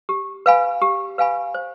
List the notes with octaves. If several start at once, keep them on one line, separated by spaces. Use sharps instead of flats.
G4
B4 F5 G#5 B5
G4
B4 F5 G#5 B5
C5